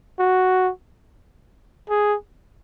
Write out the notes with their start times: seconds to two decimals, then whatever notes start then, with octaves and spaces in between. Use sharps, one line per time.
0.19 F#4
1.90 G#4